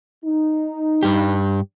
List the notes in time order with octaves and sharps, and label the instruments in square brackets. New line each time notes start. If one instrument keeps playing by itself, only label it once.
[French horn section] D#4
[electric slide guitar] G2 G4